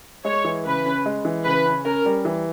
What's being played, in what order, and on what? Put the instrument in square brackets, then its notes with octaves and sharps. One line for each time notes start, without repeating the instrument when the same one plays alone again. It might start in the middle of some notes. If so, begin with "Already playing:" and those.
[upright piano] G#3 [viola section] C#5
[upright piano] E3
[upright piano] C#3 [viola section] B4
[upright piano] C#4
G#3
E3
[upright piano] C#3 [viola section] B4
[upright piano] C#4
[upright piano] C#4 [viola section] A#4
[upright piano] G3
E3